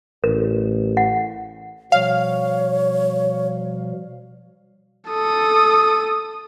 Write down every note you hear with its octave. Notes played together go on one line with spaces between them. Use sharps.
A1 A#4
F#5
B2 F3 G3 C#5 F5
A4 D#6